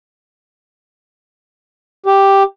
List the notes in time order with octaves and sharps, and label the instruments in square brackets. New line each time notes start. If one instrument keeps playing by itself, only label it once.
[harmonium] G4